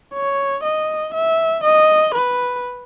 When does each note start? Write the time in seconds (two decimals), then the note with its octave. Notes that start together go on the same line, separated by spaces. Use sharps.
0.14 C#5
0.64 D#5
1.14 E5
1.64 D#5
2.15 B4